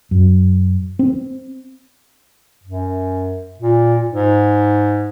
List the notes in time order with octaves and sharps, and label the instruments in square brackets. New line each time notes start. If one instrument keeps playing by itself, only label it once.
[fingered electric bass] F#2
C4
[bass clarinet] F#2
A#2
G#2